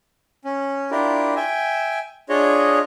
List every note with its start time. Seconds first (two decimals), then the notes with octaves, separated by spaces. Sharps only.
0.45 C#4
0.91 D4 E4 F4 G4 A#4
1.36 E5 G5 G#5
2.29 D4 F4 G#4 C#5 D#5